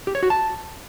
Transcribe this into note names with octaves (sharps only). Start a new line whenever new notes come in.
G4
C#5
F#4
A5